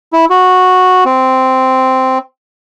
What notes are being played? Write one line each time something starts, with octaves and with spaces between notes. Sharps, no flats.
E4
F#4
C4